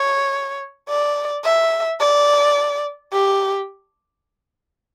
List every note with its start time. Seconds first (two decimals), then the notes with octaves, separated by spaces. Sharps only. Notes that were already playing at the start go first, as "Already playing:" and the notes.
Already playing: C#5
0.89 D5
1.45 E5
2.00 D5
3.13 G4